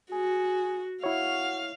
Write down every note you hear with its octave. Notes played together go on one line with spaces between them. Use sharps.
F#4 G#4
E4 F#4 C#5 F5